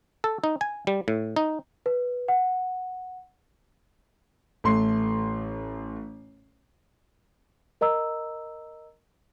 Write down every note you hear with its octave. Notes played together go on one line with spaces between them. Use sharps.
A4
D#4
G#5
G3
A2
D#4
B4
F#5
A1 A3 C6 C7
A#4 D#5 A#5 E6